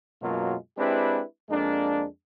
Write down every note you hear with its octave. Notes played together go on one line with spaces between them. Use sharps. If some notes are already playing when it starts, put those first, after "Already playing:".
F#2 B2 F#3 G#3 A#3 F4
G#3 C4 D4 E4 G4 B4
F2 G#3 A#3 D4